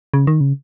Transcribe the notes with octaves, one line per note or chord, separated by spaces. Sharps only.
C#3
D#3
C#3